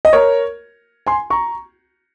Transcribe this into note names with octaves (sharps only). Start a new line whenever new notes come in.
D#5
A#4 C#5
G#5 C6
A#5 C#6